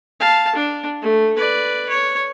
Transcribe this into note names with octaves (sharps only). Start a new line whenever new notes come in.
F5 A5
D4
A3
B4 D5
C#5